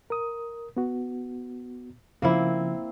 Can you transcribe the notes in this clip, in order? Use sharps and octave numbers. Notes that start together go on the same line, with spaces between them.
A#4 D#6
B3 F#4
C#3 F3 A#3 C4 E4